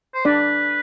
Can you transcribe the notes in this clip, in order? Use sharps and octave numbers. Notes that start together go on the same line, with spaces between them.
C5
D4 B4 D5